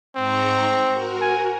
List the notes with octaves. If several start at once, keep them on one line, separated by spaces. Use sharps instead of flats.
G#2 C4 A#5 C#6
F#4 A#4
G#5